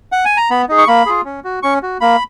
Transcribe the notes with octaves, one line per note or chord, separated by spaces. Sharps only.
F#5
G#5
A#5
B3 B5
D#4 G#4
C#6
A#3 B5
F4 G#4
C#4
F#4
C#4 C#6
F#4
A#3 B5